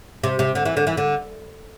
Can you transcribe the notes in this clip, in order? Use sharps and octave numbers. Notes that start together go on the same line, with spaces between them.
C3
C3
D3
E3
D3
E3
D3